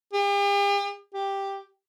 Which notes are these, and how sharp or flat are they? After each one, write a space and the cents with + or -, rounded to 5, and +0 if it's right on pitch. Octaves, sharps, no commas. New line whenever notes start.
G4 +45
G4 +5